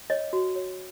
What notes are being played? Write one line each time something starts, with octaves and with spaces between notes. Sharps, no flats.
C#5 D#5
F#4
C#5